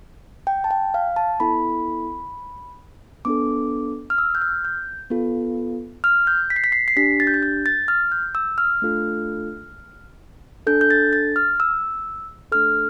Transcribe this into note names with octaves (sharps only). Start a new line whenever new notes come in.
G5
A5
G5
F5
A5
B3 E4 A4 B5
B3 D4 A4 D6
F6
E6
G6
F6
G6
B3 F4 A4
F6
G6
B6
C7
B6
C7
C7
D4 G4 B6
A6
G6
A6
G6
A6
F6
G6
E6
F6
A3 D4 F4 A4
D4 A4 G6
G6
A6
A6
F6
E6
A3 D4 A4 F6